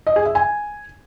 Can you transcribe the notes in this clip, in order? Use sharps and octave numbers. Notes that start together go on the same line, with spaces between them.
D#5
G#4
E5
G#5